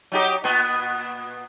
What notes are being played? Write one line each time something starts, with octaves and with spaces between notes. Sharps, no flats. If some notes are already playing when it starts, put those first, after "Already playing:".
F#3 D#4 G4
A#2 B3